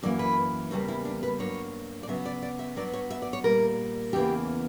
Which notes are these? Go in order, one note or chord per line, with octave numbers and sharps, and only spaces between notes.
F#2 E3 A#3 D5
B4
E2 C#3 G3 A#3 C#5
E4
D4
B4
G2 F#3 A#3 C#5
D5
C#3 F#3 B3 E5
D5
D5
E5
G2 F#3 B3 D5
C#5
E5
D5
C#5
A#2 G3 A#3 A#4
E2 C#3 E3 A#3 G4